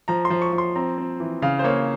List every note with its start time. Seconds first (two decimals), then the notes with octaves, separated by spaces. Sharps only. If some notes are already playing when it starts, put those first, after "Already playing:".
0.08 F3 A#5
0.25 C6
0.30 F3
0.42 C#6
0.53 F3
0.58 C6
0.76 C4 A#5
0.98 C4
1.20 E3
1.42 C#3 F5
1.59 C5
1.64 A#3 C#5